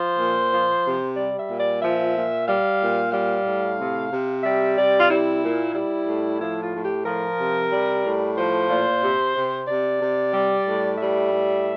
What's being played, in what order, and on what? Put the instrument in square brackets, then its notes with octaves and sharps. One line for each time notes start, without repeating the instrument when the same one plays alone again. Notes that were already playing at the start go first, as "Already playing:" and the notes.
Already playing: [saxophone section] F3 C5
A#2
F3
C3
G3 D5
E5
A#2
D5
F3 E5
A#2
G3 F5
A#2
G3 F5
A2
C3
C3
G3 E5
C3 D5
F4
G3 E4
A#2
G3 E4
A2
F3 E4
F4
A2
G4
F3 A#4
C3
G3
A2
F3 C5
A#2
C3
C3
C3 D5
C3
G3
A2
G3 E5
A2